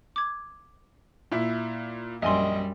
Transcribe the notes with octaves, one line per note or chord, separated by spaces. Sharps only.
D6 G#6
A#2 E4
A#1 F#2 G3 D#5 E5 G#5 C6